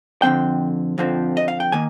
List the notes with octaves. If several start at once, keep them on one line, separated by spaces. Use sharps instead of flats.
F2 D3 F3 C4 G5
F2 D3 F3 C4
D#5
F5
G5
D#3 A#3 G#5